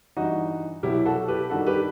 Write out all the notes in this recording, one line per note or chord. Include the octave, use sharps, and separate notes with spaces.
G2 E3 G3 D#4 F#4
C2 B2 F#3 E4 G4
F#4 A4
G4 B4
G2 D#3 G3 F#4 A4
G4 B4